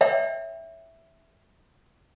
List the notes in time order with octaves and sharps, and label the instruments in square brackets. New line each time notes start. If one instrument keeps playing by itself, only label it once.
[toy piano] C#5 E5 G5